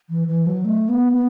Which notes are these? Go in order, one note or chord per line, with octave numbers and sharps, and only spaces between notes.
E3
E3
F#3
A3
B3
B3